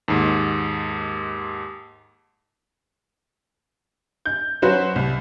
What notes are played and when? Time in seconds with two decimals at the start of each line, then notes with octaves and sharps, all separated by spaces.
0.08 D#2 G#2
4.25 G6
4.62 F#3 C#4 F#4 B4 C5
4.96 C2